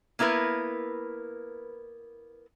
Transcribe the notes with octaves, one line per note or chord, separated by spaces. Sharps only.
A#3 B3 E4 A#4 B4